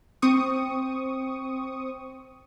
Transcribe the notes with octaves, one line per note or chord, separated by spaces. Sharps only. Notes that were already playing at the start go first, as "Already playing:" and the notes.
C4 C#6 D#6